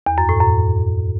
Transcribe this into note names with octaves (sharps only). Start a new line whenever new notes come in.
E2
F#2
A2
F#2